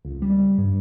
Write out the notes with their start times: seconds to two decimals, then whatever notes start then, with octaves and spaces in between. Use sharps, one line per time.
0.05 C#2
0.22 G3
0.58 G2